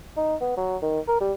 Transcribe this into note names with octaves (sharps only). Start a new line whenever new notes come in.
D#4
B3
F#3
D#3
A#4
G3